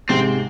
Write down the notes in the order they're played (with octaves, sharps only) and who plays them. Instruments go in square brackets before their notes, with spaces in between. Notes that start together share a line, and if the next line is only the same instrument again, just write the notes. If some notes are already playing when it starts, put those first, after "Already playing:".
[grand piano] G#2 C3 [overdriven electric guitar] C4